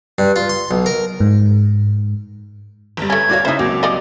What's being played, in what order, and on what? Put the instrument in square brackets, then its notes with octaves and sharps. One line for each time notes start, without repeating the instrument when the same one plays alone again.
[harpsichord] G2
F4
C6
B1
A#4
[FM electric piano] G#2
[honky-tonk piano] G1 G3
[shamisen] A3 C#4 [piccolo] G#6
[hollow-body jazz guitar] A2 F#4 F5 [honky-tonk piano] C#5 D5
[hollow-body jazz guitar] C#3 E4 [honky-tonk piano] C#4 [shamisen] D#4 C5 [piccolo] E5
[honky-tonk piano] C#2 [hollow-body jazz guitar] F#3 A#3 C4 [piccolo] D6
[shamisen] G3 D5 D#5